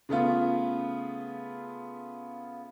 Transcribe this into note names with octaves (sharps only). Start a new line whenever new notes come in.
C#3 A3 B3 F4